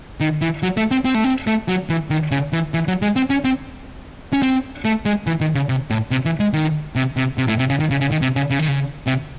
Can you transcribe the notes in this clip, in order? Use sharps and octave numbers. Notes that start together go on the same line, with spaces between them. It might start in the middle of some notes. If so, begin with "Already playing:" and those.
D#3
E3
F#3
A3
C4
C4
A3
C4
A3
F#3
E3
D#3
C#3
E3
E3
F#3
G#3
C4
C#4
C4
C#4
C4
A3
G#3
E3
D#3
C#3
C3
A2
C3
E3
G#3
D#3
C3
C3
C3
A2
C3
C#3
D#3
C#3
C#3
D#3
C3
C#3
C#3
D#3
C#3
C3